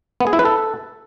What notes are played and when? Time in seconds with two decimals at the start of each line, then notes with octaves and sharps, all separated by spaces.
0.21 B3
0.27 G#4
0.33 E4
0.39 B4
0.45 A4